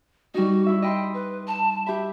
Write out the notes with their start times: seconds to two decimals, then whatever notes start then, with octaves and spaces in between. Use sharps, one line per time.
0.34 G3 D#4 F#4
0.67 E4 E5
0.82 D#5 G5 B5 C6
1.14 B4
1.47 A5
1.87 G4 E5 B5